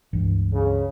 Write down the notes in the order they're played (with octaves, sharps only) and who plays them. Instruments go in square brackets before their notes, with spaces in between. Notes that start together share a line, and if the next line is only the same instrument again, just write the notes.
[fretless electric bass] C#2 G2 E3
[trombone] C#3